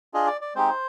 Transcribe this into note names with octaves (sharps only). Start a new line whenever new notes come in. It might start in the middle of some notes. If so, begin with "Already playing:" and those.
D4 F4 G#4 D#5
D5
D5
G#3 C4 D#4 G4 C5